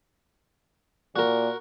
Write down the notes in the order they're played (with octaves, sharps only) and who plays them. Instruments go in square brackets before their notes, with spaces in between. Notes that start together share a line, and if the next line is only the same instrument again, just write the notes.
[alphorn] A#2 [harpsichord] F#4 A#4